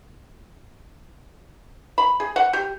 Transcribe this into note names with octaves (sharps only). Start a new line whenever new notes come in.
B5
G#4
F#5
G4